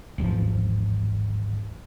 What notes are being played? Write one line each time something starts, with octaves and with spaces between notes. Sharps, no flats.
D1 G#1 E2 F3